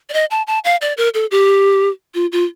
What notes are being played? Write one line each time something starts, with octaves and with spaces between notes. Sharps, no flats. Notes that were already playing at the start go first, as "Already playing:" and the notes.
D5
D#5
A5
A5
F5
D5
A#4
A4
G4
F4
F4